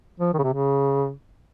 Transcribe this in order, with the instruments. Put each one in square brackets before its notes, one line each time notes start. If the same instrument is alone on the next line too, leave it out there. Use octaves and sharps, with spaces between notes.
[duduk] F3
D#3
C#3
C3
C#3